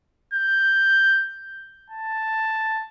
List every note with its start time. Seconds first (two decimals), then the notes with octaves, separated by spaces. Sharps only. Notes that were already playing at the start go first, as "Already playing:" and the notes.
0.34 G6
1.90 A5